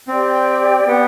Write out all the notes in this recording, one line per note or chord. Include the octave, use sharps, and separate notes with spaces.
C4 G4 D5 G5
B3